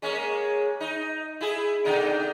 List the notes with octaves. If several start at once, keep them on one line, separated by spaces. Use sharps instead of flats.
G#3 A#3 C#4
D#4
E4 G#4
B2 D3 D#4